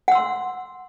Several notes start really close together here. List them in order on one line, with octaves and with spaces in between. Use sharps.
F#5 E6 C6